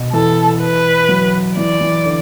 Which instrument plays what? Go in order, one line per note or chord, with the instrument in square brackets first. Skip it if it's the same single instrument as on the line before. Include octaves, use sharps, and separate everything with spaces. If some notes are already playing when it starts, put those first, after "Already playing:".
Already playing: [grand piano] B2
[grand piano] E3 [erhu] A4
[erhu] B4
[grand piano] F#3
[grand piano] E3 [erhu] D5
[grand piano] E3
D3